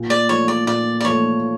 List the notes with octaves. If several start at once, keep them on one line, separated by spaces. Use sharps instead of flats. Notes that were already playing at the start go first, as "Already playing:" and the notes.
Already playing: A#2
D5
F3 A3 C#5
D5
A#2 D5
D5
F3 A3 C#5